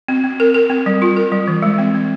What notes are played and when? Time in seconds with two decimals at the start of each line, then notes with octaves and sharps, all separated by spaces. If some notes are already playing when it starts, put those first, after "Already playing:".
0.08 C4
0.24 C4
0.40 A#4
0.54 A#4
0.70 C4
0.86 G3
1.02 F4
1.16 A#4
1.32 G3
1.48 E3
1.62 G#3
1.78 C4
1.95 C4